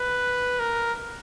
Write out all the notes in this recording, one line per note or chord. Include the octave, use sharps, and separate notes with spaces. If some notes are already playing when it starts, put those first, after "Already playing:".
Already playing: B4
A#4